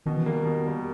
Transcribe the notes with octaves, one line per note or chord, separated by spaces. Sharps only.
B2 D#3
E3
D#3 G3 A#3
B2
G3 A#3